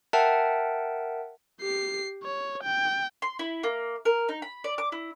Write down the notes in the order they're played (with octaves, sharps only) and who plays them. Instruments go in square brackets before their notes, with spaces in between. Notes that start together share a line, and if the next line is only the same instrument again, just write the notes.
[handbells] A#4 E5 F#5 G5 A5
[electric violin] G4 C7
C#5
G5
[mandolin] C6
E4
A#3
A#4
D#4
B5
D5
D6
E4